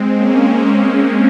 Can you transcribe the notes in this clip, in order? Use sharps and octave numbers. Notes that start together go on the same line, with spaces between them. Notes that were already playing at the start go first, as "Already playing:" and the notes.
Already playing: G#3 C4
A#3 C#4